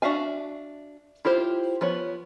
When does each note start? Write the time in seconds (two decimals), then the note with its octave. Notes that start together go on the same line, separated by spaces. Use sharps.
0.02 D4 F#4 E5 F5 G#5
1.25 E4 F4 G4 C5
1.81 F3 B3 C#5